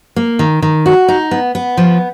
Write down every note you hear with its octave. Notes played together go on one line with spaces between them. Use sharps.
A#3
D#3
D#3
F#4
D#4
B3
B3
F3